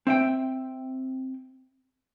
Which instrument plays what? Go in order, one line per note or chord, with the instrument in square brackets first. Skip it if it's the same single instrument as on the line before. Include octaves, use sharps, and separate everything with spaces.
[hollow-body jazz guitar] C4 E5 G5